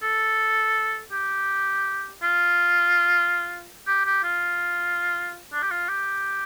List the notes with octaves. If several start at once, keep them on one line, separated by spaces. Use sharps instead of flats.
A4
G4
F4
G4
G4
F4
D4
G4
F4
G4